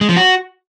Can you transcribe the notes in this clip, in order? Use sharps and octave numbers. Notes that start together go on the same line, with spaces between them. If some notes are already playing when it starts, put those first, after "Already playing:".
G#3
F3
F#4